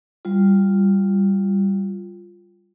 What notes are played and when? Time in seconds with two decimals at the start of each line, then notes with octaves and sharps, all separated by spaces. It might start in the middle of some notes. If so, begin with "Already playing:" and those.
0.25 G3 F4